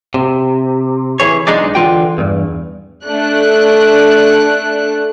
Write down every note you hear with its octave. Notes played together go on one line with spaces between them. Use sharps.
C3
E3 G#4 C#5
B1 G#3 D4 D#4 G#4 D5
D3 E3 F4 F#4 G5
E2 G2
A3 D4 F#6